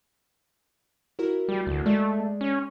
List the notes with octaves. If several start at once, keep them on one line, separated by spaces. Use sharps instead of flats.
E4 F#4 A#4
G3
D2
G#3 A3 D5
C#4